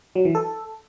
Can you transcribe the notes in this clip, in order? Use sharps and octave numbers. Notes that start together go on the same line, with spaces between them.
F#3
E3
A4